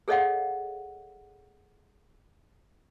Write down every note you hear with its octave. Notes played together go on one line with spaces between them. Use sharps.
G#4 A4 C#5 D#5 F5 F#5